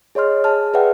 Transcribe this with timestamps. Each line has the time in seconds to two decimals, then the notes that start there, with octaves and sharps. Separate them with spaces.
0.15 G#4 C#5 D#5 C6 F6
0.44 G#4 A5 F6
0.73 G#4 B4 D5 E5 F#5 G5